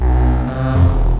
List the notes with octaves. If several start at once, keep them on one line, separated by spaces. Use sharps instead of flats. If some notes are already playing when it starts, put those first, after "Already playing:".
B1
C3
F2
E1